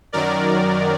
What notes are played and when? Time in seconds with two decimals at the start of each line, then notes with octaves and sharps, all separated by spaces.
0.12 F#2 D#3 F#3 A#4 D5